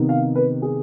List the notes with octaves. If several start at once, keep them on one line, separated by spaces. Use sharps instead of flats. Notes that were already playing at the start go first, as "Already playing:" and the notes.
Already playing: C3 D#3 B3 D#4
F5
B4
G#4